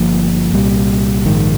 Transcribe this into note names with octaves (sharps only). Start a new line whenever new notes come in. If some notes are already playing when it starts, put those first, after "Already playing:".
Already playing: G1 G2 F3 A#3
C2 A#2 G3
A#1 G#2 D#3 G#3